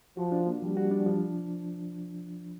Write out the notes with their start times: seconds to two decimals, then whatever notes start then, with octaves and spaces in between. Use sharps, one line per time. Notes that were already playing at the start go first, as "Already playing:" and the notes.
0.17 F3 F#4
0.32 D4
0.47 A#3
0.62 F3 G3
0.77 F#4
0.91 D4
1.06 F3